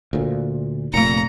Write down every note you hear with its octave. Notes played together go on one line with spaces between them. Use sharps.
D2 A#2
F1 A#2 A3 A#5 C#7